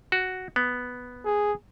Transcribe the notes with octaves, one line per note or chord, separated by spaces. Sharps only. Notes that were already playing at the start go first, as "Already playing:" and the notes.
F#4
B3
G#4